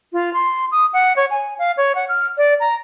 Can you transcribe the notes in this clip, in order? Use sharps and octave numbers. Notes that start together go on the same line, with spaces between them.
F4
C6
D#6
F#5
C#5
G#5
F5
C#5
F#5
F6
D5
A#5